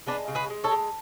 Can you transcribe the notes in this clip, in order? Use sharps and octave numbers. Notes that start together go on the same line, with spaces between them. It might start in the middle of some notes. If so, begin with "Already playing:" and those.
G#3 B3 D4
C#3
G#4 B4
G#3
A4 C#5
G#3